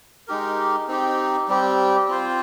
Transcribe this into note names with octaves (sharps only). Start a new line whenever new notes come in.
G#3 D#4 G4 A#4
C4 D#4 G4
G3 C4 G4
C4 F4 C5